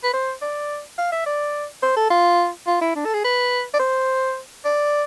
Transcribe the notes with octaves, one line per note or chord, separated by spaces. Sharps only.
B4
C5
D5
F5
E5
D5
C5
A4
F4
F4
E4
D4
A4
G#4
B4
D5
C5
D5